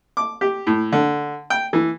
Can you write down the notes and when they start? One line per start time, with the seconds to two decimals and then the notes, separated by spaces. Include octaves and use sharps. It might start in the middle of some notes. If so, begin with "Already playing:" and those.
0.17 D6
0.41 G4
0.67 A2
0.92 D3
1.50 G5
1.73 E3